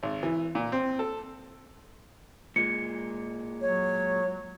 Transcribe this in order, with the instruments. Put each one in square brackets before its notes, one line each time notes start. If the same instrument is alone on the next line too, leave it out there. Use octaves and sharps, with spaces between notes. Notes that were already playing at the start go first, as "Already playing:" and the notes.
[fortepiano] G#1
E3
A#2
C4
A4
[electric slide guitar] A#2 G#3 [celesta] C#7
[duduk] F#3 [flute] C#5